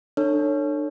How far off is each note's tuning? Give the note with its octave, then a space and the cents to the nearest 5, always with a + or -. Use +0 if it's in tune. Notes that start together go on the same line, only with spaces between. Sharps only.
D4 +35 A4 +30 C#5 +0